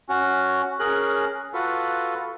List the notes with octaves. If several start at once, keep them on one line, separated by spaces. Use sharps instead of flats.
C#4 F#4
C#4 G#4 A#4 F#6
F4 F#4 A4 B4